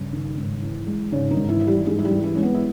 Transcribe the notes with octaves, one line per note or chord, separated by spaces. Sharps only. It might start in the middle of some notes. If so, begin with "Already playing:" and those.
Already playing: G2 C#3 C#4
D#3
G#2
E3
G#3
G#2 C#3 C#4
D#3 D#4
G#2
E3 E4
E3 E4
G3 G4
G#2 G#3 G#4
E4
G3 G4
E3
E3 E4
G#3 C#4
B3
E4